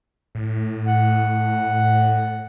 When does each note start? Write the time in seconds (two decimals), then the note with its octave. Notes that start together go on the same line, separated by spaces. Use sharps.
0.35 A2
0.86 F#5